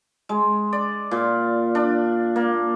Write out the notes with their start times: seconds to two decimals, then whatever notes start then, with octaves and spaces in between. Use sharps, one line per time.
0.29 G#3
0.73 D5
1.11 A#2
1.75 D4
2.36 A#3